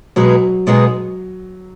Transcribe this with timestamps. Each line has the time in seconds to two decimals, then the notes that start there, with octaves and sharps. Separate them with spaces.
0.16 B2 F#3 G#3 B3 D#4 G#4
0.67 B2 G#3 B3 D#4 G#4